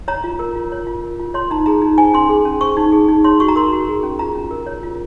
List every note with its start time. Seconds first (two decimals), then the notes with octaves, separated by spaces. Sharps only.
0.08 C#5 A#5
0.24 F4
0.39 A#4
0.56 F4
0.72 C#5
0.87 F4
1.04 A#4
1.20 F4
1.34 C#5 C6
1.51 D#4 A#5
1.66 G#4 A#5
1.82 D#4
1.98 C5 G#5
2.14 C#4 C6
2.29 G#4
2.45 C#4
2.61 C5 C#6
2.77 D#4
2.92 G#4
3.09 D#4
3.24 C#5 C6
3.40 F#4 C#6
3.48 A#5
3.56 A#4 C6
3.72 F#4
3.89 G#4
4.03 C#4
4.19 F4 A#5
4.35 C#4
4.51 A#4
4.66 C#5
4.83 F4